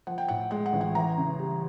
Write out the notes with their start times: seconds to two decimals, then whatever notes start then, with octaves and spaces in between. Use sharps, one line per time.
0.07 F3 F#5
0.18 G5
0.28 A2 F#5
0.51 G#3 F#5
0.66 F#5
0.73 A1
0.81 F#5
0.95 E3 A#5
1.18 C#3
1.40 G3